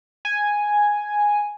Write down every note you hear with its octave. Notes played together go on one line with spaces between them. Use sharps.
G#5